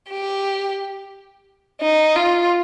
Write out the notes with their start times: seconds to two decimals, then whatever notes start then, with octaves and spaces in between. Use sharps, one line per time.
0.10 G4
1.81 D#4
2.16 F4